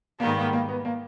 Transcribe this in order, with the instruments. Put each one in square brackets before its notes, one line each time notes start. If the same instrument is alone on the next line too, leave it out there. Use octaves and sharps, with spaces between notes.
[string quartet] G#2 D#3 G3 B3 [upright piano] A#3
[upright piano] A#3
A#3
B3
A#3